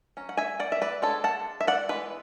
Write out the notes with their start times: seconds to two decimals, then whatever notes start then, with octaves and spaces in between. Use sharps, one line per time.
0.17 F#3 C#4
0.29 F#5
0.37 E5 G#5
0.60 D5 F#5
0.72 E5
0.82 B4 D5
1.02 G#3 D4 A4 C#5
1.24 F#5 A5
1.61 E5
1.67 D5 F#5
1.89 E3 G#3 B3 B4